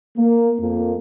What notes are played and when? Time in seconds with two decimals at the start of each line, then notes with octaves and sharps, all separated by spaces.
0.17 A#3
0.58 F2 A#3